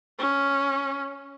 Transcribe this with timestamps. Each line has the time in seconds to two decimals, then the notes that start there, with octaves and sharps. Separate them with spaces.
0.18 C#4